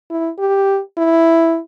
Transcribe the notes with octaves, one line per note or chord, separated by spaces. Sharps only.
E4
G4
E4